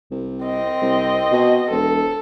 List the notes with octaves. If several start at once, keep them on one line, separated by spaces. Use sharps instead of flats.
C2
C4 D#5
C2
B2
E1 A4